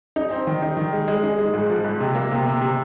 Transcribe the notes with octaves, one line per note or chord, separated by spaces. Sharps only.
D#4
C4
D#3
D#4
D#3
G#3
G#3
D#4
G#3
G#2
F3
G#2
C3
A#3
C3
C3
C3